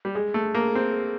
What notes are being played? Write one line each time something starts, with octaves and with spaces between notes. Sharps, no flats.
G3
G#3 G#4
A3
A#3
C4